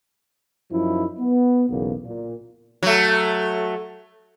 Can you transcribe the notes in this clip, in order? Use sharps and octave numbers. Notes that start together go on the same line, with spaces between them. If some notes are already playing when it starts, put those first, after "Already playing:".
F#2 F3 D#4 E4
B3
B1 E2 C#3 A#3
A#2
F#3 A3